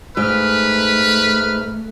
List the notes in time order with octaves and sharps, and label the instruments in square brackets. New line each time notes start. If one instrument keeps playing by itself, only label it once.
[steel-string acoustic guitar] G#2 [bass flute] A3 [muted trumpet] B4 [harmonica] F6